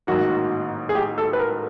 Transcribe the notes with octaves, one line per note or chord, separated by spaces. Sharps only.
A1 G#2 D#3 F#3 A#3 F#4
G#4
G4
A4
B4
A#4